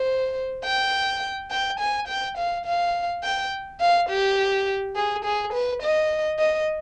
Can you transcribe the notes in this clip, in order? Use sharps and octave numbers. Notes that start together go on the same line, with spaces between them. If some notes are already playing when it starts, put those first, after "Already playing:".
Already playing: C5
G5
G5
G#5
G5
F5
F5
G5
F5
G4
G#4
G#4
B4
D#5
D#5